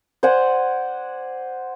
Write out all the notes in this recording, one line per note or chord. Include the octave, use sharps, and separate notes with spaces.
C5 D5 F#5 G#5